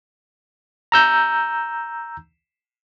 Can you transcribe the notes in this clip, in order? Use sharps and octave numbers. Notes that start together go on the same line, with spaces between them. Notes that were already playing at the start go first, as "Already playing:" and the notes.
A#5 E6 G6